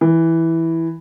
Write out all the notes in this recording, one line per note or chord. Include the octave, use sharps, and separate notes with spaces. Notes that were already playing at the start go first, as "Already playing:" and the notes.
E3